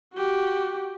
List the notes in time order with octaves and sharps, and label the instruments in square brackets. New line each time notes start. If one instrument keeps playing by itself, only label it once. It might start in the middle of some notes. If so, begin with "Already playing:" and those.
[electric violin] F#4 G4